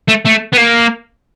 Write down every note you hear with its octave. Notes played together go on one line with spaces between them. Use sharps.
A3
A3
B3
A#3